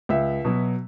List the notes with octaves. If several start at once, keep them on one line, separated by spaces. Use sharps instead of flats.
C#2 E5
B2 F#3